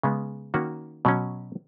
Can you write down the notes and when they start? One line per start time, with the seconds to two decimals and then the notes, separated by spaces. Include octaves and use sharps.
0.03 C#3 G#3 B3
0.54 D#3 A#3 C#4 F#4
1.05 B2 F#3 C#4